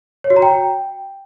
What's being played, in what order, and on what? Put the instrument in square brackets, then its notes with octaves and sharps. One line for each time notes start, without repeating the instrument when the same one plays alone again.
[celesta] C#5
F#4
A#5
G5